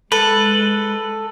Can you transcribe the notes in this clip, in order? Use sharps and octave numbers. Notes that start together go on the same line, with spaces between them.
G#3 A4 B4